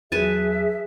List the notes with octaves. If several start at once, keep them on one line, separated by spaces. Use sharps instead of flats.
E2 F#3 G#4 B4 E5 G#5 A5